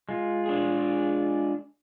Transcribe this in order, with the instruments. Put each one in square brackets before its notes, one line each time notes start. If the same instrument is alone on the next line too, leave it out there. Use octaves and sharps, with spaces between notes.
[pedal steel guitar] G#3 F4
[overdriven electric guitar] D4 G#4